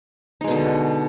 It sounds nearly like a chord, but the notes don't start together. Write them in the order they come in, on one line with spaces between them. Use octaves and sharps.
D#4 G#3 B2 D3